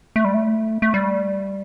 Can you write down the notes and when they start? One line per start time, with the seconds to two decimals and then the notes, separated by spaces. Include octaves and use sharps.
0.16 A3
0.25 G3
0.34 A3
0.82 A3
0.94 G3